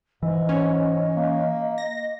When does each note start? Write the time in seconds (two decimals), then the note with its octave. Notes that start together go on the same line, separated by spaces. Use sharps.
0.23 G#2 E3 D#5
0.49 C#4
1.17 A#3
1.78 A#6